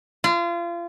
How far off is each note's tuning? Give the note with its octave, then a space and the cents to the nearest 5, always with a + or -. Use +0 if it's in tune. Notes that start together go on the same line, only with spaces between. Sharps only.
F4 -30